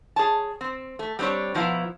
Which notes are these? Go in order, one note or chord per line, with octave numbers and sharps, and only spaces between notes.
G#4 C#5 A5
C4
A3
G3 C4 D4 C5 C#5
B2 F3 B3 E4 F5 A#5